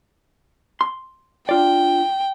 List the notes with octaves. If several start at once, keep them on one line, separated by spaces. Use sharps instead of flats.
C6
D4 F4 D5 G5